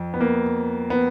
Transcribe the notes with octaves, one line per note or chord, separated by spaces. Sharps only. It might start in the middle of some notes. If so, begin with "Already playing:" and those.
Already playing: F2
B3
A#3
B3